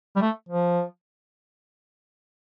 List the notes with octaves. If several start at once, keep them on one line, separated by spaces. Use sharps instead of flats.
G3
A3
F3